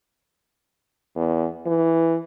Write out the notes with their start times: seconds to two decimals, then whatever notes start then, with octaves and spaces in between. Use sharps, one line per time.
1.16 E2
1.66 E3